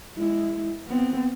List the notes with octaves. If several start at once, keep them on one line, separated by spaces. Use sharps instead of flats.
G#3 E4
B3 C4